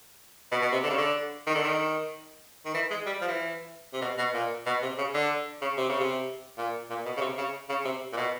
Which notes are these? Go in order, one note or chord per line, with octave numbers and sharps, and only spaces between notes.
B2
B2
C3
D3
C#3
D3
D#3
D3
D#3
D#3
E3
G#3
G3
F3
E3
C3
B2
B2
A#2
B2
C3
C#3
D3
C#3
C3
C#3
C3
A#2
A#2
B2
C#3
C3
C#3
C#3
C3
A#2
B2